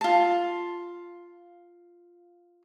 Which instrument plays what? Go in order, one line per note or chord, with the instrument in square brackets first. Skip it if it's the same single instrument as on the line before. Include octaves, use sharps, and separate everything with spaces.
[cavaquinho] F4 A5